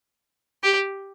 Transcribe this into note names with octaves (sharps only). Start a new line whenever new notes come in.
G4